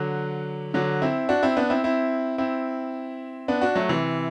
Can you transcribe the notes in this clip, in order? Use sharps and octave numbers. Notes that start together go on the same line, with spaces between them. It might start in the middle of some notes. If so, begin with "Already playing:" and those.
Already playing: D3 F#3
D3 F#3
C4 E4
D4 F#4
C4 E4
B3 D4
C4 E4
C4 E4
C4 E4
B3 D4
D4 F#4
F#3 A3
C3 E3